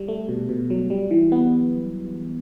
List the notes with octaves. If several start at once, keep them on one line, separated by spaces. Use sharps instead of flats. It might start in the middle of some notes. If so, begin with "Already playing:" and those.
Already playing: G3
A3
B2
B2
F#3
G3
E3
B3